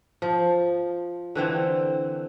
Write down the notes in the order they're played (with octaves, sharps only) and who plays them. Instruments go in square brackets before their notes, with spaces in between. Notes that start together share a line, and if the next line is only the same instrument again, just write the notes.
[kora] F3
D3 E3 C4